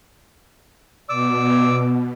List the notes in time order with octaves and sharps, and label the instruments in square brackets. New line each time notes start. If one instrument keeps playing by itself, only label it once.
[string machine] B2 [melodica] D5 D6 E6